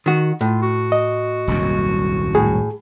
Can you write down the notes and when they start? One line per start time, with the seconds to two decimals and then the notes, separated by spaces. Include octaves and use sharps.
0.06 D#3 F#4
0.41 A2 F4
0.62 F#4
0.92 D#5
1.48 D#1 C2 F#2
2.35 A2 G#4